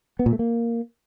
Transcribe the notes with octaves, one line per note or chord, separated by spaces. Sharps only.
B3
A#2
A3
A#3